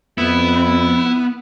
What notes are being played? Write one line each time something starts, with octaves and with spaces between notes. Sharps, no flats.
F2 B3 E4